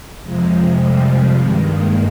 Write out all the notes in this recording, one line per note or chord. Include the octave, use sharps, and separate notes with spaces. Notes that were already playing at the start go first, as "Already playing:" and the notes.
F2 C3 F3 G#3
G3
G2 D#3 G#3
A#3